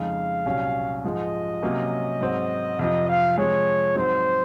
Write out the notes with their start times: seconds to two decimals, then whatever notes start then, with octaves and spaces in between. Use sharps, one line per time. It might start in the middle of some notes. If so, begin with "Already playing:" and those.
Already playing: F2 C#3 G#3 D#4 F5
0.46 C2 A#2 F#3 C#4
1.04 G#2 F3 G#3 D#5
1.62 C3 F#3 A#3 C#4
2.21 G#2 F#3 C4
2.79 F2 C3 F3 D#5
3.09 F5
3.37 C3 F3 G#3 C#5
3.96 G#2 F#3 C4 D#4 C5